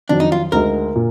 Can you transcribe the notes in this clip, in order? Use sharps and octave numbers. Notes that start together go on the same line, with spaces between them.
F2 D#3 F#3 D4
D#4
F4
D2 D3 G#3 D#4 A#4
A#2